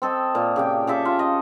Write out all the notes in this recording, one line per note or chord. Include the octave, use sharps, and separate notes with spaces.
C4 A4 D#5
A#2
C#3 G4 G5
C#3 A4 E5 D6
F4
D#5